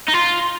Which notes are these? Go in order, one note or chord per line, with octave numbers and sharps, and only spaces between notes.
D#4
F4